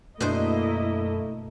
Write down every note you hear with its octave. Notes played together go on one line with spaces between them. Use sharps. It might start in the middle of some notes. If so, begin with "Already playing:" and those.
F#2 B2 A3 A#3 D4 E4 C5 D#5